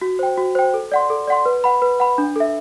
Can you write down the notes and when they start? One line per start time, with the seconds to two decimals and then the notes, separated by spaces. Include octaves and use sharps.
0.01 F#4
0.19 C5 G5
0.38 F#4
0.55 C5 G5
0.74 A4
0.92 D5 F#5 C6
1.10 A4
1.27 D5 F#5 C6
1.45 B4
1.64 F#5 B5
1.82 B4
2.00 F#5 B5
2.18 D4
2.36 A4 E5